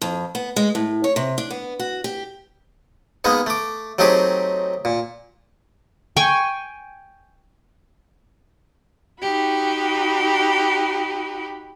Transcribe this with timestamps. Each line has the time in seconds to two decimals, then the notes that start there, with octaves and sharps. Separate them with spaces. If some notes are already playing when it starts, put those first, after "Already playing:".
0.02 F2
0.35 B3
0.56 G#3
0.75 A2
1.04 C#5
1.16 C3
1.38 D4
1.50 B3
1.79 F#4
2.04 G4
3.24 G#3 A#3 B3 D#4
3.46 A3 D6
3.99 F#3 A3 C4 D#4 G4 G#4
4.85 A#2
6.17 G5 G#5 C#6
9.21 D#4 F#4 G4 B5